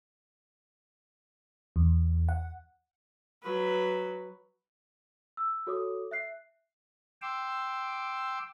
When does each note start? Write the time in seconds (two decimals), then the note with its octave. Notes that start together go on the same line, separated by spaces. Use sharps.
1.76 E2
2.29 F#5
3.43 F#3 B4
5.37 E6
5.67 F#4 A4 C#5 D6 D#6
6.11 E5 F#6 C7
7.22 G5 C6 D6 E6